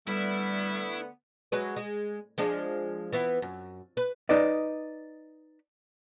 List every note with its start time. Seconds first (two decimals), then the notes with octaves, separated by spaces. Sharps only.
0.08 D3 G3 A3 B3 E4
1.52 F#3 G#3 B4
1.77 G#3
2.38 F3 G#3 D4
3.12 E3 B3 E4
3.42 F#2
3.97 B4
4.29 D#4 B4 D5 D#5